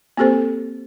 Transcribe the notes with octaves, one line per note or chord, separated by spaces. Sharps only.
A#3 C4 G4 A4 C5